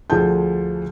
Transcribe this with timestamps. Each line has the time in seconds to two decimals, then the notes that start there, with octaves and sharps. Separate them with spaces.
0.10 D2 F3 G#4 A5 G6